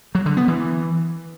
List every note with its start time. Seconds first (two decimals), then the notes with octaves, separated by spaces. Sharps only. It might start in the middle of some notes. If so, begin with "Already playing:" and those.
0.15 F#3
0.26 D3
0.37 B3
0.48 E3